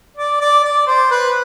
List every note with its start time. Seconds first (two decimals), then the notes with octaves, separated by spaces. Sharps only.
0.17 D5
0.41 D5
0.64 D5
0.87 C5
1.11 B4